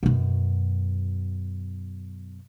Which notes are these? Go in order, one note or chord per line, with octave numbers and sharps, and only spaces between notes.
F#2 B2